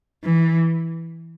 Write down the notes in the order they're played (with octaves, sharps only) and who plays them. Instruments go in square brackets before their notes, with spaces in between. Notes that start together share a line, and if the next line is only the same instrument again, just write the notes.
[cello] E3